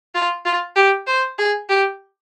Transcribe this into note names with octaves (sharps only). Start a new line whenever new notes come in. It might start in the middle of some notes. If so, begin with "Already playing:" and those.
F4
F4
G4
C5
G#4
G4